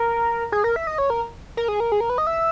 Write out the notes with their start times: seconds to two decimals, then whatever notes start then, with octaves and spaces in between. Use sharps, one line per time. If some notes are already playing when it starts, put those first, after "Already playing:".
Already playing: A#4
0.52 G#4
0.64 A#4
0.76 E5
0.87 D#5
0.98 C#5
1.10 A#4
1.57 A#4
1.68 G#4
1.80 A#4
1.92 G#4
2.01 A#4
2.10 B4
2.18 D#5
2.27 E5